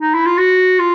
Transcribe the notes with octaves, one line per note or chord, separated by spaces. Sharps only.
D#4
E4
F4
F#4
F4